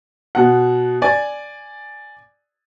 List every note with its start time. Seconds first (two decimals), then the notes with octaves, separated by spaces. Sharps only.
0.35 B2 F#5
1.02 D5 G#5